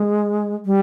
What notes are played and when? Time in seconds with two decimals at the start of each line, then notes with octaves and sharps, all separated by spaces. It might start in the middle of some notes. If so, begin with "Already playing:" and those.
Already playing: G#3
0.66 G3